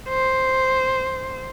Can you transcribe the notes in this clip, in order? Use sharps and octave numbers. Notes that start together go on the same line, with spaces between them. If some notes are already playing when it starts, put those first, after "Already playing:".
C5